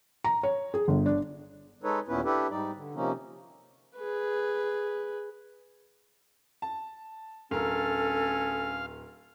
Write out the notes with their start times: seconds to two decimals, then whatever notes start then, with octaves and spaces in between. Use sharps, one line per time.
0.24 A#5
0.43 C#5
0.74 G#4
0.88 G1
1.06 D4
1.83 G#3 D#4 A4 B4 C#5
2.08 D#2 A#2 B3 C#4 E4 B4
2.25 D4 E4 G4 A4 B4
2.50 G#2 G3 D#4 D5
2.76 D3
2.95 C3 F3 A#3 C#4 D#4
3.97 G#4 B4
6.62 A5
7.51 D1 C#4 A4 A#4 F5